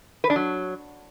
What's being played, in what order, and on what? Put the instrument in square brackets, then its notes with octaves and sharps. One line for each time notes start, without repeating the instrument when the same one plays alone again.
[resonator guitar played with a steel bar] B4
D4
F#3